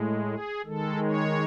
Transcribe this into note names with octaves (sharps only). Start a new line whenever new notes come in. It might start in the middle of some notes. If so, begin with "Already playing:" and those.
Already playing: A2 G#3
G#4
D#3 G#3 A4
C#5